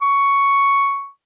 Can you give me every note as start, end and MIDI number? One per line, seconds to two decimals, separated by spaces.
0.02 1.08 85